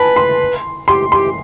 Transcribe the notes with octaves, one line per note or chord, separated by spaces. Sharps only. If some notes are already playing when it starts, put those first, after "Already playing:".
Already playing: B4 G#5 A5 B5
C6
G4 C6
G4 C6